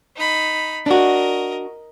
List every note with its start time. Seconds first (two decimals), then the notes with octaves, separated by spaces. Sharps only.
0.16 D#4 B5
0.86 D4 F#4 A#4 D#5